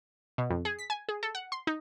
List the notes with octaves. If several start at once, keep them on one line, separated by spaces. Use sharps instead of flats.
B2
F2
G#4
B6
G#5
G#4
A4
F#5
C6
D#4